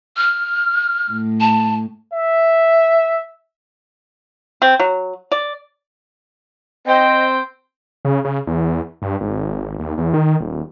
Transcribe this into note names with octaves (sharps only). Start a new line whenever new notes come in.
F6
A2
A5
E5
C4
F#3
D5
C4 C5 D#5 G5
C#3
C#3
E2
G2
G#1
D#2
E2
D#3
D#1